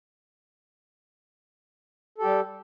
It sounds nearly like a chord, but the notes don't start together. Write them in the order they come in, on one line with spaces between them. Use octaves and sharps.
A4 G4 G3